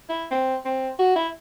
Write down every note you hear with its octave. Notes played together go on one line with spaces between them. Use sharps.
E4
C4
C4
F#4
E4